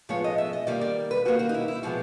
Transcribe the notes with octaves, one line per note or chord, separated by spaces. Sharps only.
A2 F3 G#3 B3 C#5
D#5
E5
D#5
D#3 G3 A#3 D5
D5
B4
D#3 G3 A#3 F#4
F#4
D#4
E4
E4
A#2 F3 G#3 B3 F#4